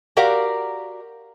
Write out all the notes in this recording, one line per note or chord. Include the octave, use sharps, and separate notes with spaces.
F#4 G4 A#4 D5 F5 F#5